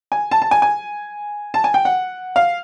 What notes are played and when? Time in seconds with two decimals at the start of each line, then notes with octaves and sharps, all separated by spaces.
0.12 G#5
0.31 A5
0.42 A5
0.51 G#5
0.62 G#5
1.54 A5
1.64 G#5
1.74 G5
1.85 F#5
2.36 F5